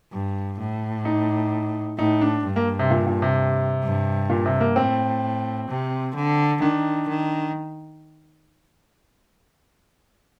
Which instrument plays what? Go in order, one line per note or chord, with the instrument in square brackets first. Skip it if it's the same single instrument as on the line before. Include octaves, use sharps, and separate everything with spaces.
[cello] G2
A2
[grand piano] D#4
[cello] A2 [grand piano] D#4
[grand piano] D4
[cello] G2
[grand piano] A#3
C3
A#2
A#2
C3
[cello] G2
[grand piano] A#2
C3
A#3
[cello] A2 [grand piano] C4
[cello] C3
D3
[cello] D#3 [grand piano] D4
[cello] D#3